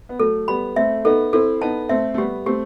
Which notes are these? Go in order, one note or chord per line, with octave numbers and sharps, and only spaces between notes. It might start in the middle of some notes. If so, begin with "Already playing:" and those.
B3
F#3 A3 A4
G3 B3 B5
A3 C4 E5
B3 D#4 A4
C4 E4 A4
B3 D#4 A5
A3 C4 E5
A3
G3 B3 G4
A3 C4 G4